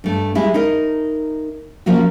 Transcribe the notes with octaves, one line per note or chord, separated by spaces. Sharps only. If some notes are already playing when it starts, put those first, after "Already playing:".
G2 A3
G3 G#3 E4
D#4 A#4 D#5
F3 A#3 C#4 F#4